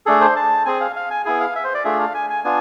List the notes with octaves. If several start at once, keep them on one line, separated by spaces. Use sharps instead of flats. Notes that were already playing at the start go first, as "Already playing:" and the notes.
A3 D4 G#4 A4
C5
A5
C4 G#4 G#5
F5
F5
G#5
B3 E4 G#4 G#5
F5
E5
C5
D5
A3 D4 F4 G#4 E5
F5
G#5
G#5
B3 D4 F4 G#5